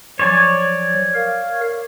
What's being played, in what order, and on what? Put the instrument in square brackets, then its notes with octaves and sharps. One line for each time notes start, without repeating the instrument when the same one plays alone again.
[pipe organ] F3 F#3 [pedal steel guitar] C#5 D5 G#5
[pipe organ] A#4 F5